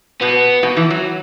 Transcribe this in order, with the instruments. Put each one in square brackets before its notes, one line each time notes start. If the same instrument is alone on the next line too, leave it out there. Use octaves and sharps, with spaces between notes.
[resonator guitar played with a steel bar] B2 [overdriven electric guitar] B3
[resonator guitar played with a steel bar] B2
E3
F#3